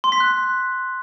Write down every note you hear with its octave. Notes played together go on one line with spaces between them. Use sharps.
C6
B6
F#6